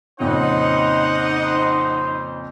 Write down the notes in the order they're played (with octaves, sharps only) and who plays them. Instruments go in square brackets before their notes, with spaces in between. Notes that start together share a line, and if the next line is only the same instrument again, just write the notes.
[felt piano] F2 A#2 C#3 [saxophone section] D#4 [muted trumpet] C5 [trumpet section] D#5 F#5